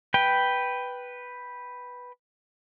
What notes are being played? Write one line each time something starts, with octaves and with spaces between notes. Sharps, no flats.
B4 G5